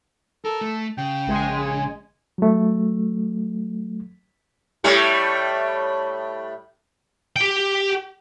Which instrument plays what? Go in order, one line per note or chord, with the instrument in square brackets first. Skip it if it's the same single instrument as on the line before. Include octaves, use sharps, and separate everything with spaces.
[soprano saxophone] A4 [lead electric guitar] A#4
[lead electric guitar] A3
[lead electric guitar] C#3 [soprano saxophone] G5
[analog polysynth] A#1 G#3 G#5
[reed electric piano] F#3 A3
[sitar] A2 G3 A3
[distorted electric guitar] G4 G5